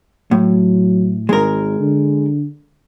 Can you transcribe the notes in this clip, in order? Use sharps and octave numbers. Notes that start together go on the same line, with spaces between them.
A2 F#3
G#1 G#3 A#4
D3